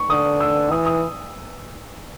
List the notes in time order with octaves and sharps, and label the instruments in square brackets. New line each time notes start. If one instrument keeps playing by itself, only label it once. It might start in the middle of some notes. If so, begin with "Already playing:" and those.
Already playing: [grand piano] C#6
[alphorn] D3 [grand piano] D#6
[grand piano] E6
[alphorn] E3 [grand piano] D#6
[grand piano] D#6